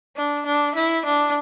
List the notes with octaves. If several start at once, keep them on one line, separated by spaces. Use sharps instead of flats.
D4
D4
E4
D4